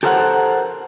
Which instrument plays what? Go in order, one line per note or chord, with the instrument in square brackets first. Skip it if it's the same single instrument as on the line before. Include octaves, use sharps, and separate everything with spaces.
[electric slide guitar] G4 A4 A#4 C5 F5 F#5